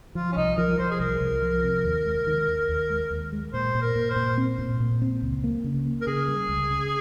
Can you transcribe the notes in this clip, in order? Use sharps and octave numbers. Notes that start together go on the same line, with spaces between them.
F3 F4
C#4
C2 D#4
F3 A#4
F3 C5
G#4
C2 A#4
C2
F3
C3
D#2
G#3
D#3
D#2
D#2
G#3
D#2
G#3
A#2 C5
A#2
A#4
A#2
C5
A#2
C4
A#2
A#2
C4
C#2
A#3
C#3
A#3
A#4
C#3 G#4
G3
C#2
C#3